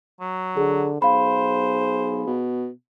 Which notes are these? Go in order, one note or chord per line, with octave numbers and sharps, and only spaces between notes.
F#3
D3 G#4
B1 G#4 C5 F5 B5
B2